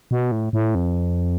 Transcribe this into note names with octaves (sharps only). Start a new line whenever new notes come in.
B2
A2
A2
F2